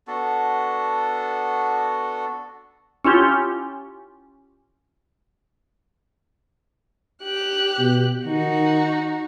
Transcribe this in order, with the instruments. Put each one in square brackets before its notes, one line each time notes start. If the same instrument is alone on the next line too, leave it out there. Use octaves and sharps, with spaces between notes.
[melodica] B3 D4 F#4 A4
[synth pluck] C#4 E4 F4 G4
[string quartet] G4 F#6
[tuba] B2
[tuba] D#3 [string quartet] D#4 F#4